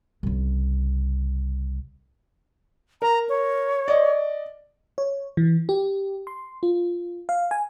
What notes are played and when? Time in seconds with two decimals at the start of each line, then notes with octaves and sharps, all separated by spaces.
0.23 C2 C#3
3.02 A#4 A#5
3.29 C#5
3.88 D5 D#5
4.98 C#5
5.37 E3
5.69 G4
6.27 C6
6.63 F4
7.29 F5
7.51 G#5